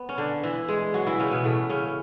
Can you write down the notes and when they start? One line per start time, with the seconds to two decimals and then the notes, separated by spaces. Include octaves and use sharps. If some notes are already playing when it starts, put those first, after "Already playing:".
Already playing: B3
0.09 C#4
0.18 D3 D4
0.43 E3 E4
0.68 G#3 G#4
0.94 F#3 F#4
1.07 E3 E4
1.19 C#3 C#4
1.31 B2 B3
1.44 A2 A3
1.69 C#3 C#4